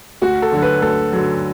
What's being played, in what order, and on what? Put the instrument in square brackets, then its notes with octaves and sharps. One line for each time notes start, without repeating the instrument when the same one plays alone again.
[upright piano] D2 [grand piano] F#4
[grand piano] A4
[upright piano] D3 F#3
[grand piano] B4
[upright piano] D2 [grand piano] A4
[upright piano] D3 F#3